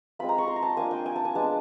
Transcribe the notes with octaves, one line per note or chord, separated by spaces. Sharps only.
G#3 C4 F4 B5
A#5
C#6
C6
A#5
A5
A#3 D4 F4 G#5
G5
G#5
A5
G#5
G#3 B3 D4 A5